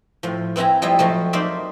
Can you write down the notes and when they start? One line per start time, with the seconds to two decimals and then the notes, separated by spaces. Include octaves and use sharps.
0.23 A2 F3
0.56 B3 C4 E4 G#5 A#5
0.82 F3 G3 E4 D#5 E5
0.99 F3 F#3 A3
1.33 A#3 D#4 C5 D5 E5